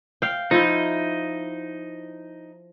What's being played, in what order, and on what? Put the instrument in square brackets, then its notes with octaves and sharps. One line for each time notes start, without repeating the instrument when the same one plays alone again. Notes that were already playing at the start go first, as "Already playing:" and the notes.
[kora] F5 G5
[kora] F3 E4 [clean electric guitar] D#4